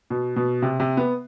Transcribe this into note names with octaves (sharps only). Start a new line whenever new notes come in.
B2
B2
C3
C3
B3